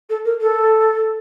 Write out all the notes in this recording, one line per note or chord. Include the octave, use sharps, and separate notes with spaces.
A4
A#4
A4